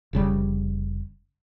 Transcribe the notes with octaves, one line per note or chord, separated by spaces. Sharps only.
F1 C#3 G3